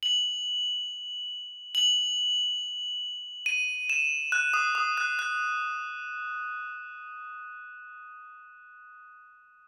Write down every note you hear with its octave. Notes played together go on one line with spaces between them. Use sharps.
F#7
F#7
D#7
E7
F#6
D#6
D#6
F#6
F#6